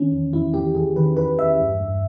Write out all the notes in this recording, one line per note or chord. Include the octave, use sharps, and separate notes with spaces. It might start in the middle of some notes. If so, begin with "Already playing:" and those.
Already playing: D#3 C#4
E2
E2 E4
E2 G4
E2 G#4
D#3 B4
E2 B4
E2 E5
G2
G2